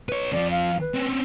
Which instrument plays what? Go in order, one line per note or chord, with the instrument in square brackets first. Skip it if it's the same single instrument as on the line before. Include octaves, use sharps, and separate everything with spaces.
[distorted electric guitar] B4 C#5
[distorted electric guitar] F2 F3 [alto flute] D5
[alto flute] F5
B4
[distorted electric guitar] C4 C#4